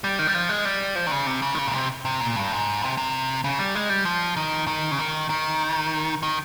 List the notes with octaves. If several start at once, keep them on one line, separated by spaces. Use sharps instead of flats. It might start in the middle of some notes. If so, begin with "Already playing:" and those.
G3
D#3
G3
F3
G#3
G3
F3
D#3
C#3
C3
C#3
D#3
C#3
A#2
C3
C3
A#2
G2
G#2
C3
C3
C#3
G3
G#3
G3
F3
D#3
D#3
C#3
D#3
D#3
D#3